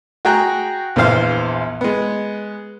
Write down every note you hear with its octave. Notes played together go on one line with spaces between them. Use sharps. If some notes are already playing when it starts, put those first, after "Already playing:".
F#4 G#4 G5 A#5 F#6
A#1 E2 E3 C5 F5 C6
G#3 B3